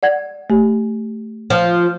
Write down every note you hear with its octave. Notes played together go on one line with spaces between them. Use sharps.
D5 F#5 G#6
A3 G4
F3